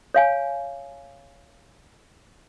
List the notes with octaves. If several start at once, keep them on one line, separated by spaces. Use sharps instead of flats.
C#5 F5 G#5